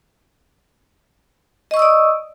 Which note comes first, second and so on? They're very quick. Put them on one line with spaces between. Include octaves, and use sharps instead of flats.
D#5 C#6 E6 D#6 D5